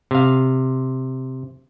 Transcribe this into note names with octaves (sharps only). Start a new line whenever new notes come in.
C3 F5